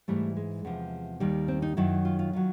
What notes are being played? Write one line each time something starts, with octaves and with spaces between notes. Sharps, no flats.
G#2 E3 G3 A3
G#3
E2 C3 F3
D#2 D#3 G3
C4
D#4
F#2 D#3 F#3 E4
F4
F4
D#3 F#3 F4